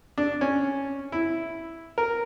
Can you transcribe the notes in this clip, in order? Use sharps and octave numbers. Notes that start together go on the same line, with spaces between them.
D4
C#4
E4
A#4